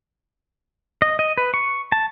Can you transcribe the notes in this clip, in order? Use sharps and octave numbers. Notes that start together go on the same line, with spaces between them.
D#5
D#5
B4
C#6
A5